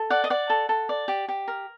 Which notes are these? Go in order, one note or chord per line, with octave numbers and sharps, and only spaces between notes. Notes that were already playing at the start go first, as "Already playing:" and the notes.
Already playing: A4
D5 F#5
D#5
D5 F#5
A4
A4
D5
G4
G4
A#4